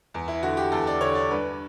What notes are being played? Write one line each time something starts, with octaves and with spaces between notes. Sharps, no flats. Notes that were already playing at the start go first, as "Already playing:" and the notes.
E2
E4
D3 F#4
G4
E2 A4
D5
D3 C#5
D5
G2 B4